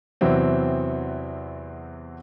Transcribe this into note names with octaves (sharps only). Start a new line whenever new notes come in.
E2 C3 E3 F#3 C4